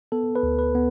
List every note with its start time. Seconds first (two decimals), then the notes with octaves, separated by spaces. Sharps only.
0.12 B3 A4
0.36 B4
0.43 D2
0.59 B4
0.75 B3